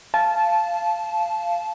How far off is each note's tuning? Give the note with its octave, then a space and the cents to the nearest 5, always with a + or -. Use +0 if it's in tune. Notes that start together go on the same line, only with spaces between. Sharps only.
F5 -15 A5 -15